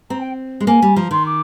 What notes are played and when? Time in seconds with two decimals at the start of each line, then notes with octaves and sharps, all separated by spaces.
0.10 C4 A#5
0.20 G5
0.60 G#3
0.67 A#3 G#5
0.82 G3
0.96 F3 A#5
1.11 D#3 C6
1.25 D6